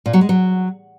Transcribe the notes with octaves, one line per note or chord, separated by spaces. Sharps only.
A#2
F#3
G#3
F#3